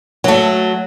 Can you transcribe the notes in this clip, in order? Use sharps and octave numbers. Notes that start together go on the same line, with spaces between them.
F#3 A3